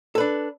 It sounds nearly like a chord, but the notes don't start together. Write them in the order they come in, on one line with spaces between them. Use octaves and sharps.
A4 B4 D4